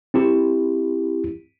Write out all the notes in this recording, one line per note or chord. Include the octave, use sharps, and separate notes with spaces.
C4 E4 G4